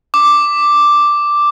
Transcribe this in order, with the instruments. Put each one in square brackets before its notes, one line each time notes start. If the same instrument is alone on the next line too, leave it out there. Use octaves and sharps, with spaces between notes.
[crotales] D6